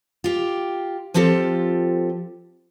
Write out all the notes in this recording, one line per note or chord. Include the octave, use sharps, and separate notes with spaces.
F4 G4
F3 C4 F4 G4 A4